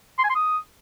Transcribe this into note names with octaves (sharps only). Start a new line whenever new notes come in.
C6
G#5
C6
D#6